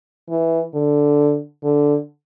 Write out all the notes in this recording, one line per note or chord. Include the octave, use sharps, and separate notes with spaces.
E3
D3
D3